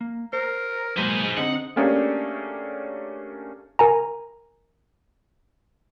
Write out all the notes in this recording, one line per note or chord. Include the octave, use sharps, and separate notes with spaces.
A#3
A#4 C5
F#3 G#3 A#3 G#4 B4 C5 D#5
D3 C4 D#4 F#5
A3 A#3 C#4 D4 G4 G#4
A#4 G#5 A#5